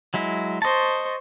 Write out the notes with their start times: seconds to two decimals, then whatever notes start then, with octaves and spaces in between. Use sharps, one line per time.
0.14 F#3 G#3 E4
0.62 C5 D#5 A5 C#6